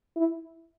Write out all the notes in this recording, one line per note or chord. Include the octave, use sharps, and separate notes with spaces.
E4